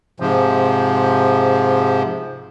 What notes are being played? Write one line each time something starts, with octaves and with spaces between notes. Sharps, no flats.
G#2 C3 F3